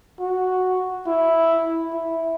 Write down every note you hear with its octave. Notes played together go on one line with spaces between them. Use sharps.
F#4
E4
E4